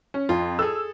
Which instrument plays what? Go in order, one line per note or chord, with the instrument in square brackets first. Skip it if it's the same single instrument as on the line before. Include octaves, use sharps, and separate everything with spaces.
[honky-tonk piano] C#4
[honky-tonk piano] F2 [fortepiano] F4
[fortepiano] G#4 A4 [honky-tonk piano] E6